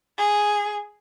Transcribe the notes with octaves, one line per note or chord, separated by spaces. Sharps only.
G#4